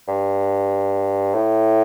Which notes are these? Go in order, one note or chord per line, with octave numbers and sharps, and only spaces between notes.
G2
A2